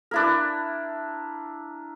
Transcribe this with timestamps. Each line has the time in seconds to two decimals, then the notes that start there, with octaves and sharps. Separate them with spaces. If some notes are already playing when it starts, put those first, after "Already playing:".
0.11 D4 E4 A#4